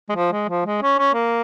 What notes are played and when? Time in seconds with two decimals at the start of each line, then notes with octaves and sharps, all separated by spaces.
0.09 G#3
0.16 F3
0.33 G#3
0.49 F3
0.66 G#3
0.82 C#4
0.99 C#4
1.14 A#3